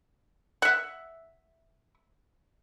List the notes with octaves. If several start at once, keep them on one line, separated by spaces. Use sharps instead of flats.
E5 F#5